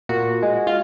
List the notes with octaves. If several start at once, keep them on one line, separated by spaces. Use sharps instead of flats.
A#2 F#4
G#3
F4